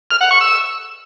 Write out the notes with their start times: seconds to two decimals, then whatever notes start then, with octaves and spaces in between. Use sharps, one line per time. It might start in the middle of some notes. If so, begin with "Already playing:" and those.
0.11 F6
0.21 F#5
0.31 C#6
0.41 E6